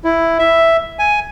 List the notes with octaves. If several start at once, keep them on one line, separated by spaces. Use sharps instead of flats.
E4
E5
G#5